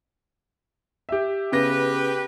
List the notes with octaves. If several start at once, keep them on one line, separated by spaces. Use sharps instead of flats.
G4 E5
C#3 B3 G4 B4 A#6